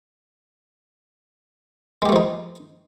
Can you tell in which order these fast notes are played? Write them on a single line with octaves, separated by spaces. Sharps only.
G#3 G4 A3 F3 D#4